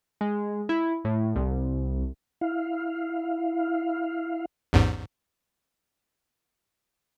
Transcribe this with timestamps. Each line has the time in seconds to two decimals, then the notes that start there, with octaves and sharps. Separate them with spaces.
0.21 G#3
0.69 E4
1.04 A2
1.36 C2
2.41 E4 F5
4.73 A1 E2 G#2